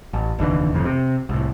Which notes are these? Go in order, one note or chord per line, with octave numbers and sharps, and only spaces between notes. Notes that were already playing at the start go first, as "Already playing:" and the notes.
A1
F1 D#2 D3 E3
F1 F2 A2
C3
C2 A2